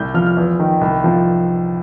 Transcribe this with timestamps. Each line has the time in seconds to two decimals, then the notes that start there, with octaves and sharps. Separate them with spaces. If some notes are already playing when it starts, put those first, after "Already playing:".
Already playing: C2 G6
0.14 F3 F6
0.26 F6
0.37 E2
0.59 D#3
0.81 C2
1.04 F3